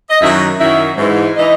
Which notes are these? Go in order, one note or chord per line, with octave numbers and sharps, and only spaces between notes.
D#5
F#2 D#3 F#3 E4 E5
F#2 D#3 F#3 E4 E5
G#2 E3
E3 D#4 D#5